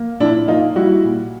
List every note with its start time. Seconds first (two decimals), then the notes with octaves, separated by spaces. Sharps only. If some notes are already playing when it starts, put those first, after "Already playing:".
Already playing: A#3
0.20 A#2 D4 E4
0.48 A#3 D#4 F4
0.75 G3 E4 F#4
1.04 A#2